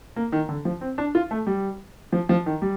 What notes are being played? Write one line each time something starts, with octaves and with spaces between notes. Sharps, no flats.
A#3
D#3
D3
F3
C4
D4
F4
A3
G3
F3
F3
D#3
G3